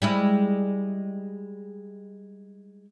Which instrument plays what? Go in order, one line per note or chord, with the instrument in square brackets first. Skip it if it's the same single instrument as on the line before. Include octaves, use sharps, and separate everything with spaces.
[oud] G3 G#3 E4